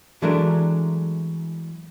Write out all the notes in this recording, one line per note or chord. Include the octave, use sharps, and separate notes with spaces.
E3 F#3 G#3 A3 D4 A#4